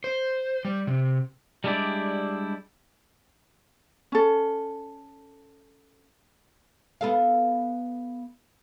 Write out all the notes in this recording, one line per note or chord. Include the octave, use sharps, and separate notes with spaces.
C5
G3
C3
G3 G#3 D4 E4 G4 D5
C#4 A4
B3 A4 F5